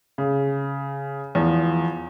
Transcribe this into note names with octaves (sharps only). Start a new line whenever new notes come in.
C#3
E2 F3